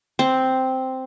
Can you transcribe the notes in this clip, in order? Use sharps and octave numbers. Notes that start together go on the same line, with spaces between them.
C4